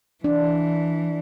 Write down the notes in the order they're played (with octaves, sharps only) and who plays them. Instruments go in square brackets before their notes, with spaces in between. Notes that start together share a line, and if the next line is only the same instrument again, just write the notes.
[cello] E3 [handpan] D4